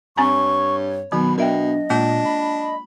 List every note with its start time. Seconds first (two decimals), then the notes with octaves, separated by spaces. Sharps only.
0.17 G2 C4 C#5 G#5 A#5 C#6
1.12 B2 D#3 F#3 B3 B5
1.38 B2 D4 A#4 D#5 E5 G5
1.90 A#2 G#3 A#3 D4 F4
2.25 B5